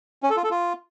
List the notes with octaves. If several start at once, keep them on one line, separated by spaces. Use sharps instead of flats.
C#4
A4
F4
A4
F4